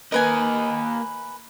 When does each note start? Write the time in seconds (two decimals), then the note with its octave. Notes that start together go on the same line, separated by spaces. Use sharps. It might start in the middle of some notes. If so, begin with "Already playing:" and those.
0.12 A#3 A#4 B4 D#5 G#5